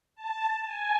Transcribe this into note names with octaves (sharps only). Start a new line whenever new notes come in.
A5
G#5